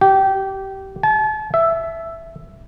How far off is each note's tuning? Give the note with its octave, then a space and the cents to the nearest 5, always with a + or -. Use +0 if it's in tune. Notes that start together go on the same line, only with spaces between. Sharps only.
G4 -20
A5 -40
E5 +5